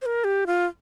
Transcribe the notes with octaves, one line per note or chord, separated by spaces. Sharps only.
C5
A#4
G4
F4